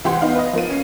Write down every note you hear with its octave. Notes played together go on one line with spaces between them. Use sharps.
C2 E3 G4 F#5 C6
B3 D#4 F5
B4 D#5
F3 A#3 D#7
C#4 C7